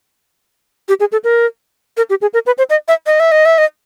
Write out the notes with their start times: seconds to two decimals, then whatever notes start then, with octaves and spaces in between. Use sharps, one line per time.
0.89 G4
1.00 G#4
1.12 A4
1.24 A#4
1.97 A#4
2.10 G4
2.22 G#4
2.34 A#4
2.46 B4
2.58 C5
2.70 D#5
2.88 E5
3.07 D#5
3.20 E5
3.32 D#5
3.45 E5
3.58 D#5